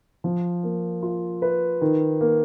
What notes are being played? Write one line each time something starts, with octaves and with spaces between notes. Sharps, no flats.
F3
A#3
F4
B4
D#3
A#3